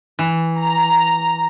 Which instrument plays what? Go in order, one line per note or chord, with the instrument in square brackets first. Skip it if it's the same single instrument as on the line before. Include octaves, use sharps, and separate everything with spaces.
[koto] E3
[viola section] A#5